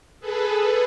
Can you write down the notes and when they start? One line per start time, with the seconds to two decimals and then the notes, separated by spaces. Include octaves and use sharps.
0.20 G#4 A4 B4